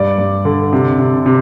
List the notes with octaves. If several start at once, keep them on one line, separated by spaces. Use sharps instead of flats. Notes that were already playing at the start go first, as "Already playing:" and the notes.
Already playing: G2 D5
G2
D3
C3
C3
C3